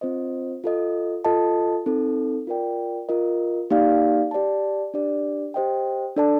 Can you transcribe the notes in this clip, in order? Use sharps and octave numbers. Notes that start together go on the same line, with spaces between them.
C4 F4 C5 D#5
F4 A4 D#5
F4 A4 D#5 A5
C4 D#4 A4
F4 A#4 D5 G5
F4 A#4 D#5
A#3 D#4 G4 D5 F5
G4 D5 A5
D4 G4 D5
G4 C5 D#5 G5
D4 A4 D5 A5